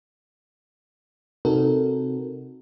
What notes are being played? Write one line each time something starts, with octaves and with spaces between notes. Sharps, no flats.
C3 C4 D#4 F#4 A4 A#4